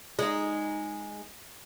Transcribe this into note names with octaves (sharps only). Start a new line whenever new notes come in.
G#3 D#4